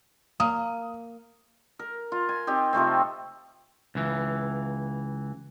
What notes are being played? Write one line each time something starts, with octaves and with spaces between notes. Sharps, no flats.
A#3 D#6
A#4
F4
G#5
C4 D#4 G4
C3 F3 A3 C4
C#2 E3